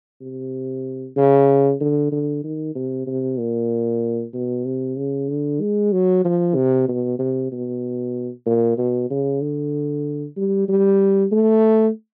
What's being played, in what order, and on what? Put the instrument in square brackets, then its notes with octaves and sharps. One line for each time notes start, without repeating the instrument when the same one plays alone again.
[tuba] C3
C#3
D3
D3
D#3
C3
C3
A#2
B2
C3
C#3
D3
G#3
F#3
F3
C3
B2
C3
B2
A#2
B2
C#3
D3
G3
G3
A3